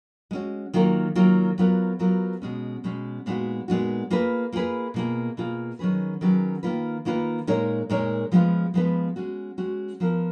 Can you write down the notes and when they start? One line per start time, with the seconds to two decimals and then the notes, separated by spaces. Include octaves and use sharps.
0.31 G#3 C#4 F#4
0.74 D#3 F#3 A#3 F4 A#4
1.15 D#3 F#3 A#3 F4 A#4
1.58 F#3 B3 F4 A#4
1.99 F#3 B3 F4 A#4
2.42 B2 G#3 C#4
2.84 B2 G#3 C#4
3.26 A#2 G#3 B3 D#4 F#4
3.68 A#2 G#3 B3 D#4 F#4
4.11 A#3 F4 G#4 B4
4.52 A#3 F4 G#4 B4
4.94 B2 A#3 F4 G#4
5.37 B2 A#3 F4 G#4
5.79 D#3 F#3 C#4 G#4 B4
6.21 D#3 F#3 C#4 G#4 B4
6.63 D#3 A#3 F4 B4
7.05 D#3 A#3 F4 B4
7.47 A#2 G#3 D#4 A#4 C#5
7.90 A#2 G#3 D#4 A#4 C#5
8.32 F3 G#3 B3 F4 B4
8.74 F3 G#3 B3 F4 B4
9.16 G#3 C#4 F#4
9.58 G#3 C#4 F#4
10.00 F3 B3 F4 A#4